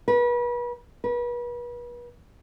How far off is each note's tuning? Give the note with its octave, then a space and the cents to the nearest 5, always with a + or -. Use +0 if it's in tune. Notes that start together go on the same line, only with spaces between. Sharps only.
B4 -35
B4 -35